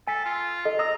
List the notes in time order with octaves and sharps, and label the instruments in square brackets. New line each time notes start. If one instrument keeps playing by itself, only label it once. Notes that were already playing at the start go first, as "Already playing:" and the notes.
[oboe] A4 [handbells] G#5 B6
[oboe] F4
[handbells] A4 D#5
[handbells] D#5 D#6 E6 [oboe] A#5